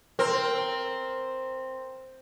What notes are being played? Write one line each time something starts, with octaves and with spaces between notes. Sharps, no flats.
C4 A#4 A#5